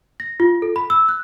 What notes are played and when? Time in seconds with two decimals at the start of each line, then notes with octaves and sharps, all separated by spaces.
0.20 A#6
0.40 F4
0.62 A4
0.76 B5
0.90 E6
1.09 F#6